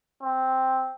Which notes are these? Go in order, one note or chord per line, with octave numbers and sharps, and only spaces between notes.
C4